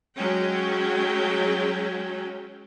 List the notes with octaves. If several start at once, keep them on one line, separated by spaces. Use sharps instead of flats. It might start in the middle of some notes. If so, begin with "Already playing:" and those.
F#3 G#3 C#4 G5